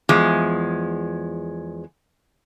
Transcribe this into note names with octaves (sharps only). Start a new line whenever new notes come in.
E2 F3 G#3